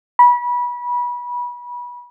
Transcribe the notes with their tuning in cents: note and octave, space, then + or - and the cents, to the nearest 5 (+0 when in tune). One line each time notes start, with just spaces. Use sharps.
B5 -25